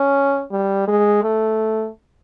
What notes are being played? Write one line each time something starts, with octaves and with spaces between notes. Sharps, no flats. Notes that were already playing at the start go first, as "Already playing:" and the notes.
Already playing: C#4
G3
G#3
A3